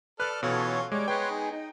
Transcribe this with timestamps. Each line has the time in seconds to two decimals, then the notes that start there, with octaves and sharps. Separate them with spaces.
0.20 A4 B4 D5 F6 F#6
0.43 B2 E3 F#3 C#4 F4 A4 C#5
0.92 G3 G#3 C#5 D6
1.08 G#3 B3 B4 C#5 G5 C6
1.30 D#4 G#4
1.51 D#4